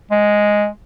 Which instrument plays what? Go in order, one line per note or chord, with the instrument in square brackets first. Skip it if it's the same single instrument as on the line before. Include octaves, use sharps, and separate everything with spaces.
[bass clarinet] G#3